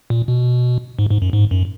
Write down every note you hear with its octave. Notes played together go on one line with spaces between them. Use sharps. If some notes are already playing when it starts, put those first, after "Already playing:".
A#2
B2
G#2
G#2
F#2
G#2
F#2